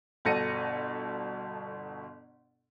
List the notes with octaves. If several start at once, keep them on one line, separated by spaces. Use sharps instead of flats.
G1 B2 A4 A#6 C#7 D#7